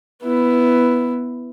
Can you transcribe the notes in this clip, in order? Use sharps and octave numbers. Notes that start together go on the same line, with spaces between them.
B3 E4